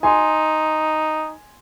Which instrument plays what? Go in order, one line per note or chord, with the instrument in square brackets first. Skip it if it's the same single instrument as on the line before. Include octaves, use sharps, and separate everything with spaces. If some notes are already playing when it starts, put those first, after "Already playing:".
[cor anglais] D#4 [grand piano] G#5 C6